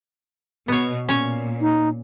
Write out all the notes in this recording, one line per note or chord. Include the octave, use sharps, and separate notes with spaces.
B2 B3 C#5
A#2 C#4 C#5
D#4